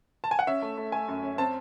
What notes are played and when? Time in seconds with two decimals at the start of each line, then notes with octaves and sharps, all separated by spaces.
0.24 A5
0.31 G#5
0.39 F#5
0.47 C#4 E5
0.62 A3
0.78 A3
0.92 A3 G#5
1.08 F#2
1.23 C#4
1.38 C4 A5